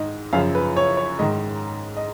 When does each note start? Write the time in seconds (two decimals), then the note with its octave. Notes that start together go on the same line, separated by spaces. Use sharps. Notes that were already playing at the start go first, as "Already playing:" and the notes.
Already playing: G#2 D#3 D#5
0.33 F#2 C#3 F3 F5
0.55 B4
0.77 C#5
0.97 C#5
1.19 G#2 D#3 D#5
1.97 D#5